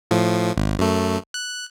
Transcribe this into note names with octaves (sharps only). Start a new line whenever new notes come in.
A2 F3
G#1
F#2 A3
F#6